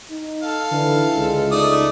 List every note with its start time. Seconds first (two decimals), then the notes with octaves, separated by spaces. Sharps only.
0.11 D#4
0.42 A4 F5
0.72 D3 E3
1.16 C#2 G#3
1.52 A3 D#4 D5 D#6